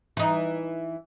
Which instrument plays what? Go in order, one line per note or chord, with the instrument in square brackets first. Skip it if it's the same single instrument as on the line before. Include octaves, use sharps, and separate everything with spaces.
[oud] E3 D#4